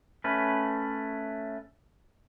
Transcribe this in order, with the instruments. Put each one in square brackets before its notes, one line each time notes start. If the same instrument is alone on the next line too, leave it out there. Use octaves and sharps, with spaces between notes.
[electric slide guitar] A3 C#4 B4